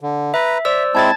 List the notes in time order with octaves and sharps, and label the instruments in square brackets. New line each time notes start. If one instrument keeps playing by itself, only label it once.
[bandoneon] D3
[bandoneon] B4 A#5 [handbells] E5
[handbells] C5 D5 E6 [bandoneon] E5
[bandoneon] G#3 C4 E4 [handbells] A5 G#6 A6